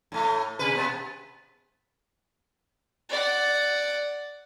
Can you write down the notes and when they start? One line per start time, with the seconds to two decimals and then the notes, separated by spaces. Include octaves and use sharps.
0.12 A2 A3
0.59 C3 B4
0.75 B2 B3
3.10 D5 F#5